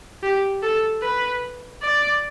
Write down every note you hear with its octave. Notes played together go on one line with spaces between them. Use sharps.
G4
A4
B4
D5